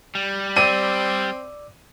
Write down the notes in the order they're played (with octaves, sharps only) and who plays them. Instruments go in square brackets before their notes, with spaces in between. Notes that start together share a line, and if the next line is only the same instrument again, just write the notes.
[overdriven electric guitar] G3
[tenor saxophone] C4 [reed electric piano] D5 D6 E6 [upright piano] D#7